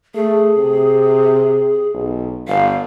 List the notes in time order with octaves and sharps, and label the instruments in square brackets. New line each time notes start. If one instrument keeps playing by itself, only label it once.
[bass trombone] A3 [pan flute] G#4
[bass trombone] C3
B1
[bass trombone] G1 [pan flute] F5